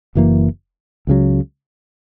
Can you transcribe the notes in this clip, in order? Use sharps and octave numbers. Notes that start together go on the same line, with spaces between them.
F#1 F#2 E3 A#3
C#2 C#3 F#3